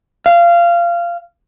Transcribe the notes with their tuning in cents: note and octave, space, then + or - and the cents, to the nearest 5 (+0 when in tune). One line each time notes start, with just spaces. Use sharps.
F5 -20